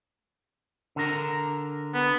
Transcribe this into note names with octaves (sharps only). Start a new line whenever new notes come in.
D3 A#4
B3